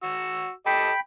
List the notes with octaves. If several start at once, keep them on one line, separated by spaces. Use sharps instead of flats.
F#4 E6
G4 A4 D#5 G5 B5